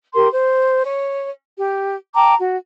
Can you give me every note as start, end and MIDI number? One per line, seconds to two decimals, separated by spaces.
0.14 0.27 67
0.14 0.27 70
0.14 0.27 84
0.33 0.84 72
0.85 1.30 73
1.58 1.97 67
2.16 2.35 79
2.16 2.35 81
2.16 2.35 82
2.16 2.35 86
2.40 2.57 66